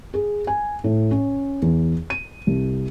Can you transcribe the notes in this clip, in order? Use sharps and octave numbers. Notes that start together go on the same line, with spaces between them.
G#4
G#5
A2
C#4
E2
D#7
C2